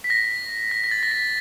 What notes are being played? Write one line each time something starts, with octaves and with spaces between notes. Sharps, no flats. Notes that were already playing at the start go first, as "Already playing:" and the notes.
B6
A#6
A#6
A#6
A6
A#6
B6